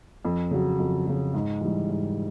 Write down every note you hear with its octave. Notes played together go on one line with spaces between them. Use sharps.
F2
C#3 F#3
F2
C#3 F#3
G#2
E3 G3
G#2